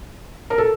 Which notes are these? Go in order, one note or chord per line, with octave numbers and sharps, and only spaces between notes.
A#4
A4